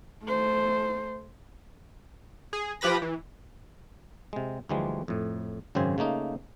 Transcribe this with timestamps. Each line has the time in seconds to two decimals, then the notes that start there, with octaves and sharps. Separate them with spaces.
0.24 A3 C5
2.53 G#4
2.81 F3 G4 B4 B5 A#6
3.02 E3
4.33 C3 G#3
4.69 D2 E3 F3 G3 G#3
5.08 F2 A2
5.75 G#1 F#2 C#3 C4 C5 G#5
5.98 C#3 A3 A#3 D#4